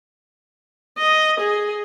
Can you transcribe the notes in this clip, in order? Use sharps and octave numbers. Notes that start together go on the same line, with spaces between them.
D#5
G#4